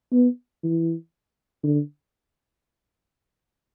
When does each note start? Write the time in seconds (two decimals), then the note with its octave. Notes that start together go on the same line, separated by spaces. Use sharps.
0.12 B3
0.64 E3
1.64 D3